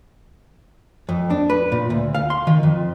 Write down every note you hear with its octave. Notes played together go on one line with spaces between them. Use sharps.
F2
D4
B4
A#2
D2
F5
C6
D#3
F2